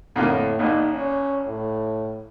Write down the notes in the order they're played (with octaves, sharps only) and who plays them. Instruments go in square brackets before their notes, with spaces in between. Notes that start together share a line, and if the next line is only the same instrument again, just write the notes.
[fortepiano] F2 D3 A#3 [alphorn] A2
[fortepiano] A#1 E2 A#2 [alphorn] D#4
[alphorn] C#4
A2